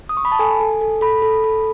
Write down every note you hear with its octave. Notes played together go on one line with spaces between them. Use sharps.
D#6
C#6
B5
A5
A4 G#5
A4
A4
A4 B5
A4
A4